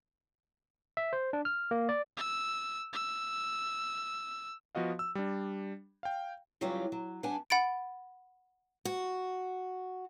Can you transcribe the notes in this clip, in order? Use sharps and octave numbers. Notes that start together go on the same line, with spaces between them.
E5
C5
D4
F6
A#3
D5
E6
E6
F3 B3 F#4 D#5 F5
E6
G3 D4
F5 G5
C#3 E3 F#3 G3 F4 G4
F#3
G3 B3 D4 F#5 G#5 A5
F#5 B5 A6 D7
F#4